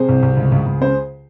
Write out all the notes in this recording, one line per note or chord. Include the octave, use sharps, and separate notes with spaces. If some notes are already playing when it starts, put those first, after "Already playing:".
Already playing: C3 G#4 C5
C2
C2
C#2
C#2
C#2
C#3 C5